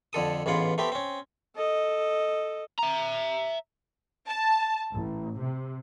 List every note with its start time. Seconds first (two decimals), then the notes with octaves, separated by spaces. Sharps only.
0.13 F2 D3 A4 D#6
0.46 A1 G#2 B3 F4 F#5
0.78 A3 B3 C4 G4
0.92 C4 C#4
1.55 A4 D#5
2.79 E5 A#5
4.27 A5
4.93 A1
5.39 C3